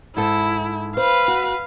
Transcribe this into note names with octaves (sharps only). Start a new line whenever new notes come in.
G#2 E4 A4
B4 C5 F5
F#4